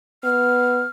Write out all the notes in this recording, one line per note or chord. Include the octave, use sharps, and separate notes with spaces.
B3 F6